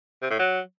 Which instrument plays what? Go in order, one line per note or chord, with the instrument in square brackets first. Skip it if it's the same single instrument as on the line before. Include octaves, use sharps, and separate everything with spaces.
[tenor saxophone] C3
A2
F#3